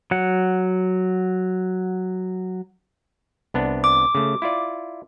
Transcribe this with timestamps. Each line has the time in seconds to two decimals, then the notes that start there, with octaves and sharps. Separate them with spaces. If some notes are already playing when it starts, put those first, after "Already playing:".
0.11 F#3 F#5
3.54 C2 B3 D4
3.84 D6
4.15 C#3 A3
4.42 E4 F4 D5